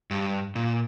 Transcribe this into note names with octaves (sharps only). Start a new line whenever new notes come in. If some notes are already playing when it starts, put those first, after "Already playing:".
G2
A#2